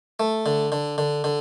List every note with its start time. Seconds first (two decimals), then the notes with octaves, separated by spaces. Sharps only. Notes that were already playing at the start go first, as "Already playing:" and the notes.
0.20 A3
0.46 D3
0.72 D3
0.98 D3
1.24 D3